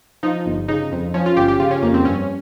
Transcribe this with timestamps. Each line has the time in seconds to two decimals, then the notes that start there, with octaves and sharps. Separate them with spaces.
0.23 F3 D#4
0.46 G1
0.68 C#3 D#4
0.92 F2
1.14 F3 C#4
1.26 F4
1.37 G1 G4
1.48 G4
1.59 C#3 F4
1.71 C#4
1.83 F2 A#3
1.94 C4
2.05 G2 C#4